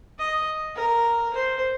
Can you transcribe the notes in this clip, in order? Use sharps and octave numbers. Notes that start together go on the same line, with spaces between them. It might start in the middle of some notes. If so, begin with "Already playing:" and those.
D#5
A#4
C5